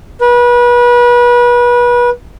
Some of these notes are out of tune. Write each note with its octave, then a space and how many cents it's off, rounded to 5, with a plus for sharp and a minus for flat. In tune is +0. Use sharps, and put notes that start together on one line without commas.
B4 -30